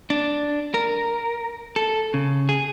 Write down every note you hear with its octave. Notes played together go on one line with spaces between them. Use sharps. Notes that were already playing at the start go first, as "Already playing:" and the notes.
D4
A#4
A4
C#3
G#4